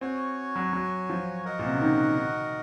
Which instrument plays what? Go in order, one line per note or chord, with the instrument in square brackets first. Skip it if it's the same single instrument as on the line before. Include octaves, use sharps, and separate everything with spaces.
[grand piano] C4 [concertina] F#4 C#5 G#5
[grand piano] F#3
F#3
F3
[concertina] F#4 A#4 D#5 F#5
[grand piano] A#2
C3
C#3
D#3
D#3